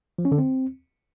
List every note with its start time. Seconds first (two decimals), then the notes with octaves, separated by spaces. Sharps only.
0.18 F3
0.25 C#4
0.32 D3
0.38 C4